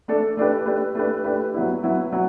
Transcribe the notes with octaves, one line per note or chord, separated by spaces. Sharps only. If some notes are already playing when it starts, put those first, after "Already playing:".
A3 D4 A4
A3 D4 G4 B4
A3 D4 G4 B4
A3 D4 G4 B4
A3 D4 G4 B4
F#3 B3 E4
F#3 B3 E4
F#3